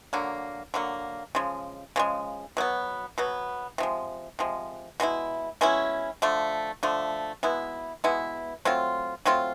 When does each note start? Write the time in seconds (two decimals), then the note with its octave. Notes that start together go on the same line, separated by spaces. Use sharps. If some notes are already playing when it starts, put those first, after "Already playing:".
0.13 D3 F#3 A#3
0.74 D3 F#3 A#3
1.35 C#3 F3 G#3
1.96 C#3 F3 G#3
2.57 B2 F#3 B3
3.18 B2 F#3 B3
3.78 C3 F3 G#3
4.39 C3 F3 G#3
5.00 B2 G#3 C#4 E4
5.61 B2 G#3 C#4 E4
6.22 D3 F3 A3
6.83 D3 F3 A3
7.43 B2 G#3 B3 E4
8.04 B2 G#3 B3 E4
8.65 F#3 A3 C4 F4
9.25 F#3 A3 C4 F4